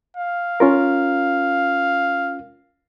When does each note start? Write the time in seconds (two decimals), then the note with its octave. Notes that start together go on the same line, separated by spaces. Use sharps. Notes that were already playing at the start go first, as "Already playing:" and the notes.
0.17 F5
0.60 C#4 F4 A#4